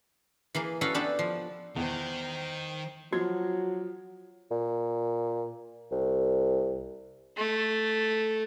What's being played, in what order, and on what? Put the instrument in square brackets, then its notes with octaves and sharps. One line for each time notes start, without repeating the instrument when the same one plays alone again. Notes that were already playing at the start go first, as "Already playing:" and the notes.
[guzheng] E3 A#3 G#4
C#4 E4 F#4 A4 B4 F5
B3 D4 G4 A4 A5
F3
[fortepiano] E2 [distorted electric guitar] D#3 [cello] C5 G5
[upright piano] F3 G#6 [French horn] F#3 [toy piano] F#4
[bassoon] A#2
C2
[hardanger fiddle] A3